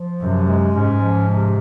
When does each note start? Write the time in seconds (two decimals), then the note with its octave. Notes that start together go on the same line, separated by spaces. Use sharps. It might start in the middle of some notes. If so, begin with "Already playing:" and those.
Already playing: F3
0.20 F#2 C3
0.47 G#3
0.74 G#2 C#4
1.01 F3
1.28 C3